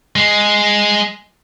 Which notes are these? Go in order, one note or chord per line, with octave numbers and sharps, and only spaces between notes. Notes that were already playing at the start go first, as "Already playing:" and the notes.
G#3